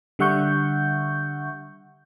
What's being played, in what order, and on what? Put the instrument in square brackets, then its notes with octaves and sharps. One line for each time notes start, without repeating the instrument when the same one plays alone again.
[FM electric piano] D3 G3 E5 F#5 C#6 G6